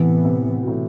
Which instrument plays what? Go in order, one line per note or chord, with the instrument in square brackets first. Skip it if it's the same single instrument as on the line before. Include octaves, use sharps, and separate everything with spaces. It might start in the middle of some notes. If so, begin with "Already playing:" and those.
Already playing: [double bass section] A2 E3 B3 [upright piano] C3
[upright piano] C3
B2
A2